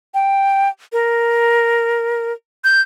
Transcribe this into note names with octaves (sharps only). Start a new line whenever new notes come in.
G5
A#4
G6